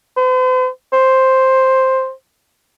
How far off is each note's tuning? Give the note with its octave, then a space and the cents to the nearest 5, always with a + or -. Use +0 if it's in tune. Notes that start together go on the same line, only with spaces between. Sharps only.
C5 -45
C5 +5